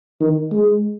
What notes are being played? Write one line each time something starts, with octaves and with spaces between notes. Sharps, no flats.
D#3
G#3